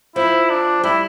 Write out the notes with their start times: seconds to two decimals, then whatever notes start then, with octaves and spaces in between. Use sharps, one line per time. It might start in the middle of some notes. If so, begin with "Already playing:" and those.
0.16 F3 E4
0.50 D4
0.83 G3 E4